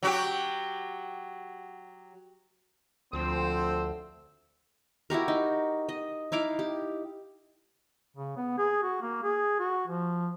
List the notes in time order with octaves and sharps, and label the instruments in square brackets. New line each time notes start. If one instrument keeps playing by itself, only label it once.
[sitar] F#3 F#4 G4
[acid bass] D2 [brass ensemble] F3 A4 C5 [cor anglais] C4 [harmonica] E6
[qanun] E4 F#4 G4 A#4
D#4
D#5
D#4 E4 F5 D6
G4
[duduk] C#3
B3
G#4
F#4
A#3
G#4
F#4
F3